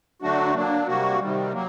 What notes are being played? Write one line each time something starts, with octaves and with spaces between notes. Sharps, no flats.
D3 F#3 A3 D4 F#4
F#3 A#3 D4
C3 G3 A#3 F#4
C3 D#3 G3
F#3 A#3